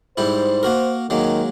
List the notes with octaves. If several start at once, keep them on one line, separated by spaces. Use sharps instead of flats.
G#2 G3 E4 C5
A#3 F#4 A#4
D#3 F#3 G#3 A#3